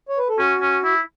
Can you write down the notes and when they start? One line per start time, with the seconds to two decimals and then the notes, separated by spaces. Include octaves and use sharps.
0.09 C#5
0.18 B4
0.29 A4
0.38 C#4 F#4
0.61 C#4
0.84 E4